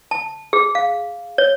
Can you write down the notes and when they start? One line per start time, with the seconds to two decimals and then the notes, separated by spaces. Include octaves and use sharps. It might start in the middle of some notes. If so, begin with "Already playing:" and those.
0.11 A5
0.53 G#4
0.75 F5
1.38 C#5